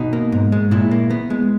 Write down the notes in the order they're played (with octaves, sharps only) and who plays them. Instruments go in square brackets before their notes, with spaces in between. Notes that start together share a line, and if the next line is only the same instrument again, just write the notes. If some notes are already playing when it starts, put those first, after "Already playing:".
Already playing: [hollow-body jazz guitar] B2 D#4
A#3
G#2
G#3
A#2 E4
A#3
B3
G#3